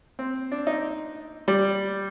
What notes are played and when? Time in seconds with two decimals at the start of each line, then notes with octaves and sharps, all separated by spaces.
0.19 C4
0.52 D4
0.67 D#4
1.48 G3